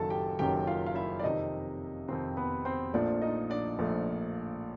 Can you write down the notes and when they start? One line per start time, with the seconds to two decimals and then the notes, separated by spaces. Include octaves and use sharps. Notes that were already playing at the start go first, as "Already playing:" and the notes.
Already playing: F#1 F#2 D#3 F#3 A4 A5
0.10 G4 G5
0.39 F#1 F#2 D#3 F#3 G4 G5
0.67 F4 F5
0.86 F5
0.95 E4 E5
1.19 D5
1.24 F2 C3 D#3 D#4 D#5
2.08 F2 C3 D#3 C4 C5
2.37 B3 B4
2.65 C4 C5
2.94 A#1 A#2 F3 A3 D4 D5
3.22 D#4 D#5
3.50 D4 D5
3.79 A#1 A#2 F3 A3